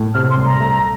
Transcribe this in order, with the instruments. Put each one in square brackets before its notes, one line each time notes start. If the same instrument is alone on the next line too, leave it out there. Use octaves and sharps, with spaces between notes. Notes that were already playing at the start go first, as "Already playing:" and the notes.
Already playing: [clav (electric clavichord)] A2
[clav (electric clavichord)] C3 [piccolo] F6
[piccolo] C6
[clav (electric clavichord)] C2
[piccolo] A#5
[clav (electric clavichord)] A3